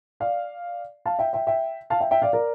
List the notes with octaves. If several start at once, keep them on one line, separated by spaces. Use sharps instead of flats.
D5 F5
F5 A5
E5 G5
E5 G5
E5 G5
F5 A5
E5 G5
E5 G5
D5 F5
A#4 D5